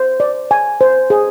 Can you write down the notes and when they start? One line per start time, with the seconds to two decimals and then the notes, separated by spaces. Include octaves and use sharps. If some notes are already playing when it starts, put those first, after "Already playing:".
Already playing: C5
0.20 D5
0.51 G#5
0.81 C5
1.10 G#4